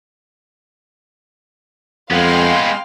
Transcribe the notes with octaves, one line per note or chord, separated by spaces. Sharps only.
F2 G#3 B3 F5 G5 C6